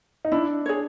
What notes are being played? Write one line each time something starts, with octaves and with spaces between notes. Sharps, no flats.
D#4
D4 E4
G#4 C#5